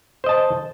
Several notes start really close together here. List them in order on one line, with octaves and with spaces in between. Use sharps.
C5 D#5 A5